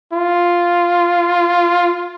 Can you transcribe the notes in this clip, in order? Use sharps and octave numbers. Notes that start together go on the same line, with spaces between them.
F4